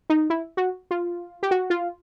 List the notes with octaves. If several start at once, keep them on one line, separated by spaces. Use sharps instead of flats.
D#4
E4
F#4
F4
G4
F#4
F4